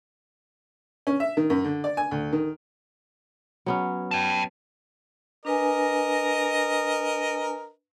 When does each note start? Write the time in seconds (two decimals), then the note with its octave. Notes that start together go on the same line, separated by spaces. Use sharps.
1.07 C#4
1.20 E5
1.37 D#3
1.50 F#2
1.64 D3
1.84 D5
1.97 G#5
2.11 D2
2.32 D#3
3.66 F#3 B3 C#4
4.11 G5 A5
5.45 D4 A#4 B4 D#5 G#5